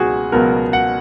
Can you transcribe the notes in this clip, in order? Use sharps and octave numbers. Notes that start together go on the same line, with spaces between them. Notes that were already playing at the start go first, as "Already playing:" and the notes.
Already playing: C#2 B2 F#3 B3 F#4 G#4
C#2 B2 F#3 B3 A#4
F#5